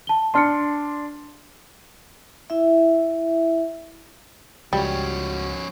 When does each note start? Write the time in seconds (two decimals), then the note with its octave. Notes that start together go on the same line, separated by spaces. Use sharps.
0.07 A5 G7
0.34 D4 A5 C6 F6 C#7
2.50 E4 E5
4.73 C#2 F3 G3 C#4 F#4